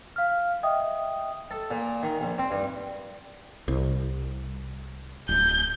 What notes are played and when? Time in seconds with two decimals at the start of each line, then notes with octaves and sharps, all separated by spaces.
0.16 F5 F6
0.63 D#5 E5 G5 D#6
1.51 A4
1.71 A#2
2.03 D#3
2.21 A#1
2.38 C4
2.51 G2
3.68 C2
5.29 D1 G6